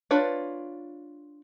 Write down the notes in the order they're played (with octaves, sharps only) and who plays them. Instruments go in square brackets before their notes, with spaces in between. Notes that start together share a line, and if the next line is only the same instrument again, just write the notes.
[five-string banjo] D4 F4 B4 C#5